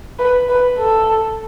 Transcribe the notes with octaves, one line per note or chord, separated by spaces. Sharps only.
B4
B4
A4